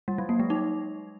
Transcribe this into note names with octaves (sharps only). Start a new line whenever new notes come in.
G3
F#3
A#3
G#3
D#4